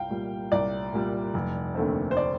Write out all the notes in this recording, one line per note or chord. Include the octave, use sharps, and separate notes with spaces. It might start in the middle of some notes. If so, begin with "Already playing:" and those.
Already playing: C2 F5 G5
A#2 G3
C2 D5
A#2 G3
F1
D#2 D3 A3 C4
C5
D5